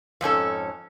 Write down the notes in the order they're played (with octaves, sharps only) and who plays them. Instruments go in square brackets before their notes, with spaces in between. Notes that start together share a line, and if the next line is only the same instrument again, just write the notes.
[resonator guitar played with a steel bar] F2 G#2 C#4 A4